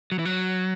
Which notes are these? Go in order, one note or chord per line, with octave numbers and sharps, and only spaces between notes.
F#3
E3
F#3